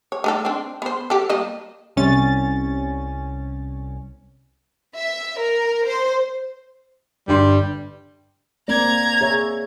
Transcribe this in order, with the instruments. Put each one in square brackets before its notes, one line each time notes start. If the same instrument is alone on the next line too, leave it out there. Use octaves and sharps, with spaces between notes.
[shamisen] C#5
A3 D#4 A4
C4 D4
B3 C5
G4 A4
G3 A#3 D#5
[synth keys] C2 C#4 A6
[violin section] E5
A#4
C5
[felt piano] G1 G2 C6 [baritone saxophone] G3
[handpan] A#3 C4 D5 [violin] A#5 G#6
[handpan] G#4 C#5 E5